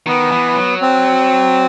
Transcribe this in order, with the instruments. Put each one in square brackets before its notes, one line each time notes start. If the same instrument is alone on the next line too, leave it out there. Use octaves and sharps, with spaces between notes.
[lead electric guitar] D#3 [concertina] B3
[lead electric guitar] E3
F#3
[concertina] C4